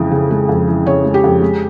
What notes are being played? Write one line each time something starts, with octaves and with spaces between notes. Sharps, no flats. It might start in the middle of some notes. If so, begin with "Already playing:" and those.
Already playing: F2 C#3 E3 G#3
C#3
G#3
F2
E3
C#3 C#5
G#3
G4
F2
G#3